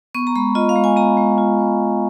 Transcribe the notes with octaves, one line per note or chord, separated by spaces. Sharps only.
B3 C#6
A#5
G#3 B5
F4 D#5
F5
G#3
G#5
B3 A#5
G#3
F4
G#3